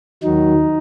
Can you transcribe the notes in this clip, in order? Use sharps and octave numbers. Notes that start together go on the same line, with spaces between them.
D#2 D#3 F#3 D#4